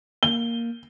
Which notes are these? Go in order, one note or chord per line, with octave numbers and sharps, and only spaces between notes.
A#3 G7